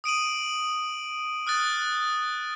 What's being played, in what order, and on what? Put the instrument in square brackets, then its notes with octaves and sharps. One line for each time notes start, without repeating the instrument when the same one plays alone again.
[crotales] D#6 D7 D#7 F#7
D#6 F6 F#6 A6